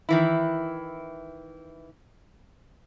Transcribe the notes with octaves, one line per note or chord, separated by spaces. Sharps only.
D#3 E3 E4